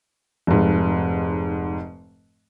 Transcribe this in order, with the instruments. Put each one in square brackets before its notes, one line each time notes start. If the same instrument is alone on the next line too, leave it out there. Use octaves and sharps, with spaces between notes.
[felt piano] F1 G#2